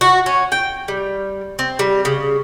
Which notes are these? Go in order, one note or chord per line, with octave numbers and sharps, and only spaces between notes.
F#4
C#4
G5
G3
C4
G3
C#3